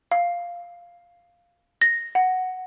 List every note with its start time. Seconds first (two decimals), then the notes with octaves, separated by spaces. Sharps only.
0.11 F5
1.82 A#6
2.15 F#5